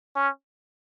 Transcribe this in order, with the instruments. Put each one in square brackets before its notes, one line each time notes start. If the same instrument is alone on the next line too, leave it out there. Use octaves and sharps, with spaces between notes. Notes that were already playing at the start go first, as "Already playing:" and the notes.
[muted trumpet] C#4